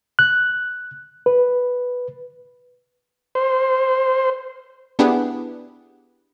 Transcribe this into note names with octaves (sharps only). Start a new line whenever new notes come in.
F#6
B4
C5
B3 D4 E4 G4 G#4 B4